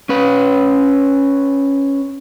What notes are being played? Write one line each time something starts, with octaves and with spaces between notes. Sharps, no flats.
C#4 B4